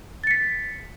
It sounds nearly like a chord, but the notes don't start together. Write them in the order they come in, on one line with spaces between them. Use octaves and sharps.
A6 C#7 B6